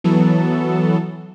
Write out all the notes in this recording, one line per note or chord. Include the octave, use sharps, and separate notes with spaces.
E3 F#3 B3 A4